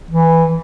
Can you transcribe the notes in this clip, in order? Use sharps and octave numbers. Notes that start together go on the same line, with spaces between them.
E3